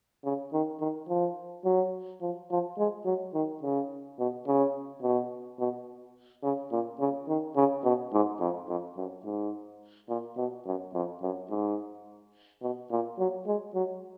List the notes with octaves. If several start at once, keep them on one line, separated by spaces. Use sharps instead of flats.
C#3
D#3
D#3
F3
F#3
F3
F3
G#3
F#3
D#3
C#3
B2
C#3
B2
B2
C#3
A#2
C#3
D#3
C#3
B2
G#2
F2
F2
F#2
G#2
A#2
B2
F#2
F2
F#2
G#2
B2
A#2
F#3
G#3
F#3